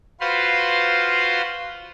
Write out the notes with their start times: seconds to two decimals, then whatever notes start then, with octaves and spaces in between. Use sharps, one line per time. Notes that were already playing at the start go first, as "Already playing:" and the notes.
0.20 F4 F#4 B4 C5 F5 C6